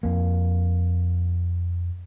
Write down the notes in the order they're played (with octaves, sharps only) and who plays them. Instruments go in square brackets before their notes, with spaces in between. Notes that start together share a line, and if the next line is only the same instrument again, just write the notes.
[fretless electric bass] F2 A#3